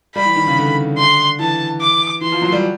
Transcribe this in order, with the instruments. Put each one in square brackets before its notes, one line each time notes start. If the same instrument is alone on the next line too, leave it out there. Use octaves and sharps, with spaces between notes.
[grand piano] G3 [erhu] B5
[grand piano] E3
D#3
C#3
D3
[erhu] C6
[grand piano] E3 [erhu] A5
[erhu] D6
[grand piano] E3 [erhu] C6
[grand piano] F3
F#3
G3